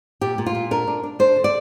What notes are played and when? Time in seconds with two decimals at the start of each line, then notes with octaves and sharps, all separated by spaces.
0.21 A#2 G4
0.38 A#2
0.46 F4
0.55 A#2
0.71 D4 A#4
0.87 D4
1.03 D4
1.19 D4 C5
1.36 D3
1.44 D5